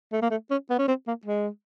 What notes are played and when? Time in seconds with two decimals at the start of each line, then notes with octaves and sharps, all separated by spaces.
0.13 A3
0.22 A#3
0.30 A3
0.51 C#4
0.70 B3
0.78 C#4
0.88 C4
1.07 A#3
1.25 G#3